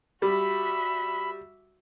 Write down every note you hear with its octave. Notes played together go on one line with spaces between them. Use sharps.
G3 F#4 E5 B5